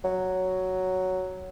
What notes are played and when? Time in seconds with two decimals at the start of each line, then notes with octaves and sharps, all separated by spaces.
0.04 F#3